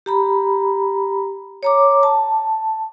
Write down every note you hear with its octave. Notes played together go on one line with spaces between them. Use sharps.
G4 A#5 B5
C#5 A#5 D6
A5